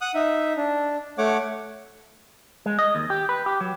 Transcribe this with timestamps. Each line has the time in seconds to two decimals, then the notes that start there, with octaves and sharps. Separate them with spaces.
0.01 F#5 D#6 F#6
0.14 D#4 E5
0.57 D4
1.18 A3 C#5 F#5 D6
2.66 G#3
2.79 D#5
2.95 D#2
3.10 G4
3.29 B4
3.46 G4
3.61 F#3